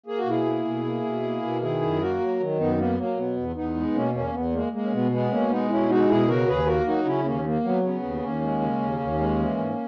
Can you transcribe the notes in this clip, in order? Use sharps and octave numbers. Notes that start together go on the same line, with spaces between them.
A#3 G#4
F#4
B2 E4 G#4
A#3
B2
A#3
B2
A#3
B2
D#3 E4 G#4
F#2
A#3 F#4 A#4
F#3
D#3
F#2 B3 D#4
A#3 B3
F#3 A#3
B2 B3
E2
E2 B3 D#4
G#3
B2 A#3 C#4
E2 A#3 C#4
E2 B3
G#3 A#3
G#3 A#3
C#4
B2 B3
G#3 B3
B2 A#3 C#4
G#3 B3 D#4
B2 C#4 E4
G#3 D#4 F#4
B2 E4 G#4
C#3 F#4 A#4
D#2 G#4 B4
A#3 F#4 A#4
F#3 D#4 F#4
C#3 C#4 E4
D#2 A#3 C#4
A#3
F#3 B3
C#3 B3
D#2
D#2 A#3 C#4
G#3
C#3
D#2
D#2
G#3
E3
G#2